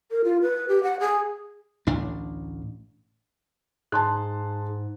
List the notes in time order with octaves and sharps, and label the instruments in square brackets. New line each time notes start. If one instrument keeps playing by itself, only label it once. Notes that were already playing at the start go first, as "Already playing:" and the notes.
[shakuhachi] A#4
F4
B4
G4
F#5
G#4
[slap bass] A1 D2 A2 D4
[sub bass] G#2 [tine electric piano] D#4 G#4 [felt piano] A5 C6 F#6